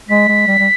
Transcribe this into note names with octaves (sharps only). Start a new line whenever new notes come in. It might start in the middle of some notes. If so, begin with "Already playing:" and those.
G#3 B6
G#3
G3
G3